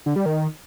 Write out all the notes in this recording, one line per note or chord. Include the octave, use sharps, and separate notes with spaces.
D3
G3
D#3